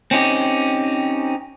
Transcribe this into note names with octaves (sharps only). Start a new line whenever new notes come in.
C4 C#4 D#4 G4